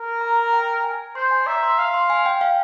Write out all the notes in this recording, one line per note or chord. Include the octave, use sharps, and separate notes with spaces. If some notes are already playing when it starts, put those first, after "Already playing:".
Already playing: A#4
A#5
G5
G#5
C5 C6
G#5
E5 A#5
C6
F5 C6
C6
G#5
G5
F5